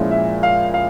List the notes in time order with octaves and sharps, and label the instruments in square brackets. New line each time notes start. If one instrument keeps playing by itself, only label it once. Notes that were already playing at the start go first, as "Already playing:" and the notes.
Already playing: [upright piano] A#2 F3 G#3 C#4 E4
E5
F5
F5